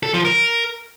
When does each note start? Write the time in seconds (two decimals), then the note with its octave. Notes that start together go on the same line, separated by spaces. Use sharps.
0.03 A4
0.14 F3
0.25 A#4